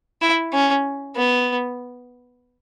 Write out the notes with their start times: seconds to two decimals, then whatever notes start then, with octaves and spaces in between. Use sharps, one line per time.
0.21 E4
0.53 C#4
1.16 B3